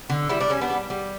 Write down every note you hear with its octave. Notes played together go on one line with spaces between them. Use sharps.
D3
G3 E4
D4
G3 C#4
B3 D4
G3
G3